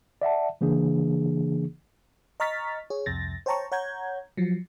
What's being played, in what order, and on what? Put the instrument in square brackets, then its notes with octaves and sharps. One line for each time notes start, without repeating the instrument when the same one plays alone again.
[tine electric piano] D5 E5 F#5 A5
C#3 E3 A#3 D4 G#4
[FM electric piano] D#5 A#5 C#6 F6 A6 B6
G#4 C#5
C2 F2 C3 A6 A#6
C5 C#5 G5 A5 A#5 C#6
C#5 F#5 A#5 G6 G#6
F3 F#3